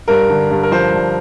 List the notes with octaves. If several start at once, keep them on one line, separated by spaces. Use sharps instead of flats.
G2 A#4
D3
G2
A#4
F3 C5
G2